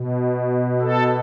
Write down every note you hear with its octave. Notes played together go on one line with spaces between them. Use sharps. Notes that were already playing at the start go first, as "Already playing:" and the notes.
Already playing: B2
A4